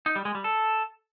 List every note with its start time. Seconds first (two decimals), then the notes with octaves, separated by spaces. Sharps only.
0.06 D#4
0.16 G3
0.25 G#3
0.35 G3
0.44 A4